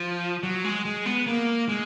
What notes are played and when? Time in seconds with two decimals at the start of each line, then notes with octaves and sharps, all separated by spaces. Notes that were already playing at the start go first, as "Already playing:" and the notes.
Already playing: F3
0.43 F#3
0.64 G#3
0.85 G#3
1.06 B3
1.27 A#3
1.69 G#3